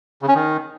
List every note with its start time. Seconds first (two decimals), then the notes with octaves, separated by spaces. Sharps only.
0.22 C#3
0.28 C#4
0.35 D#3